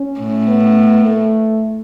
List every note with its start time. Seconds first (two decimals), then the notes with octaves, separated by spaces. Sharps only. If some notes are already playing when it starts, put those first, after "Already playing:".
Already playing: C#4
0.20 A2
0.48 B3
1.05 A3